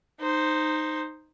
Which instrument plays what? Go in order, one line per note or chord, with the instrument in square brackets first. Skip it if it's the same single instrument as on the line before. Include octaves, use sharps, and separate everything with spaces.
[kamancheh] D#4 C5